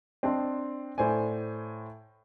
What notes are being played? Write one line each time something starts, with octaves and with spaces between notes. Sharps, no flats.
C4 D4 D#5 A5 C6
A2 C5 D5 G#5